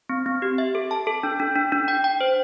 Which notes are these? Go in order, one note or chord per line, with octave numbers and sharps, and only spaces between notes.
C4
C4
G4
E5
A4
A5
A4
D4
D4
D4
D4
G5
G5
C5